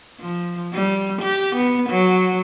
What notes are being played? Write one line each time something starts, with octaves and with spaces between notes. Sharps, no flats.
F3
G3
G4
B3
F#3